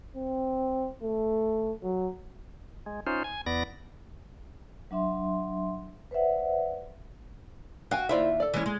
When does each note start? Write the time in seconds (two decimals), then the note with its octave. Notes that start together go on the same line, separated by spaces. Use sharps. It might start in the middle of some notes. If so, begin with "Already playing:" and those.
0.16 C4
1.02 A3
1.82 F#3
2.86 G#3
3.07 C#4 D#4 F4 C5
3.24 G#5
3.46 E2 B3 D5 A#6
4.91 F#3 D4 E5 C6
6.11 B4 C5 D5 E5 F#5
7.91 F#4 F5 G5 G#5
8.09 D#2 E4 F4 C5 D5 E5
8.40 A4 D5
8.54 E3 G#3 C#4
8.66 G#3